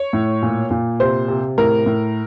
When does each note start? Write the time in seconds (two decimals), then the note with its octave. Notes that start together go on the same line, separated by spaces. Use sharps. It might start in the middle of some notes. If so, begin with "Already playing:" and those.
Already playing: C#5
0.13 A2
0.42 A#2
0.70 A#2
1.00 C3 C5
1.28 C3
1.58 A2 A#4
1.86 A2